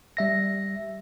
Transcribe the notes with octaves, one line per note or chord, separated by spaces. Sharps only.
G3 E5 A#6